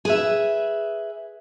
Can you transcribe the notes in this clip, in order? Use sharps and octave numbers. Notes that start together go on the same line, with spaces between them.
G#4 B4 E5